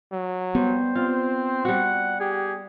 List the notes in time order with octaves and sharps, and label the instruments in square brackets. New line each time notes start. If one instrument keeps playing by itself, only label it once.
[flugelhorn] F#3
[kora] G3 [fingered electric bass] B3 [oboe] C5
[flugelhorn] C4 [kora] F4
[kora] G3 F#4 [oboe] F#5
[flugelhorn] G4 [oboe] G#4